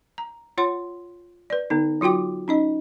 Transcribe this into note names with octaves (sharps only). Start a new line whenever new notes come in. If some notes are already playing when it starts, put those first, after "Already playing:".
A#5
F4 C#5 F#5 C6
B4 D5
D3 B3 D#4
F#3 F4 F#4 G5 D6
C#4 D#4 D#5